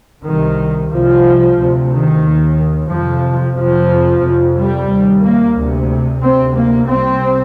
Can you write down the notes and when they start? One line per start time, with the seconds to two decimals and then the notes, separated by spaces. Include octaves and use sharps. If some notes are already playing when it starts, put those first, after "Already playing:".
0.25 C2 C3 D#3
0.91 C2 C3 F3
1.57 D2 C3
1.90 D#3
2.23 D#2
2.90 F2 C3 F3
3.56 F2 C3 F3
4.22 F2 C3
4.56 G3
4.89 D#2
5.22 A#3
5.55 D2 C3
6.21 D2 C3 C4
6.54 A#3
6.88 C2 C3 C4